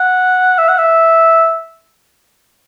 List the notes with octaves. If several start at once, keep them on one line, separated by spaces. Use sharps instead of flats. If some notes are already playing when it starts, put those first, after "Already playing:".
Already playing: F#5
E5
F#5
E5